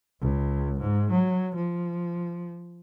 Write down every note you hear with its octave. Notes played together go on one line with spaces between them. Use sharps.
C#2
G#2
F#3
F3